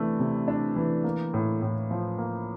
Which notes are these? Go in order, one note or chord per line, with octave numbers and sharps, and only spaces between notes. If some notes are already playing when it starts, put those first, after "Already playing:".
Already playing: C3 E3 A3 D4
C3
D4
E3
A#3
A2
A2
F3
A#3